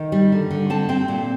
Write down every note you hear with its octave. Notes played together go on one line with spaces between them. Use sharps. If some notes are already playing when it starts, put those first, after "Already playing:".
Already playing: D#3
G3
D3
D3
C4 A5
C4 G5
A#2